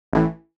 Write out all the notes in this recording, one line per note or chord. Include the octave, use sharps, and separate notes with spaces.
A1 A2 E3